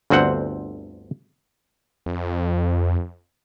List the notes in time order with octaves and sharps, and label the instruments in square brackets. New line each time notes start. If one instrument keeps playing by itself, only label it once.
[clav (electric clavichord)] G1 D2 C4 C5 F#5
[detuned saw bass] F2